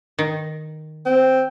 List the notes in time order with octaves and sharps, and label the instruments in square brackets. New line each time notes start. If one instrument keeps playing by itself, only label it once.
[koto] D#3
[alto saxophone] C4